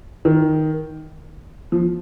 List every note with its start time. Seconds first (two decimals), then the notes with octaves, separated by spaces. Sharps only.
0.25 D#3
1.72 F3